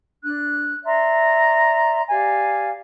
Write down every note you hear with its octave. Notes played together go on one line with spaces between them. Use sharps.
D4 F#6
D5 E5 A#5 C6
G4 D5 F5 G#5